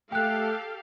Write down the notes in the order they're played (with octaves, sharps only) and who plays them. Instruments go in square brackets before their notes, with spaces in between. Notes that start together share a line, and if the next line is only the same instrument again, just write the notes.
[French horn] A3 [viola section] G4 A4 F5 [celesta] G5 F#6